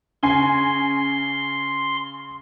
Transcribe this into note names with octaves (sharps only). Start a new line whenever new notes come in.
C#3 G#5 C6 C7